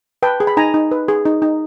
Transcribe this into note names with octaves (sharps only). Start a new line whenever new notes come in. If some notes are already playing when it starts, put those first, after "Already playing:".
B4 G5 A5
G#4
B5
D#4 G#5 A#5
D#4
B4
G#4
D#4
D#4